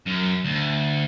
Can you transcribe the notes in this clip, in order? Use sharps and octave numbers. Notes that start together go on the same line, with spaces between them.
F#2
D2